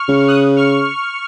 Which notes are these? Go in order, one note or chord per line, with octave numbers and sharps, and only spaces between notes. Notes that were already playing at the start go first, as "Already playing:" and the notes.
Already playing: C#6 F6
C#3
D#6 F#6
C#6 F6